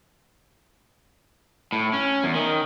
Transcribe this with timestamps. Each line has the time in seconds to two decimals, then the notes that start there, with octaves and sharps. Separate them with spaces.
1.72 A2
1.93 C#4
2.24 E2
2.35 D#3